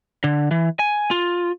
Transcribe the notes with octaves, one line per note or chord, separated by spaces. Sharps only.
D3
E3
G#5
F4